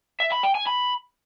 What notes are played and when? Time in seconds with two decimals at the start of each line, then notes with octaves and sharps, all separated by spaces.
0.20 E5
0.32 B5
0.43 G5
0.55 G#5
0.67 B5